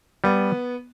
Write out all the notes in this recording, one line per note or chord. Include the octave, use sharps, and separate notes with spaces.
G3 B3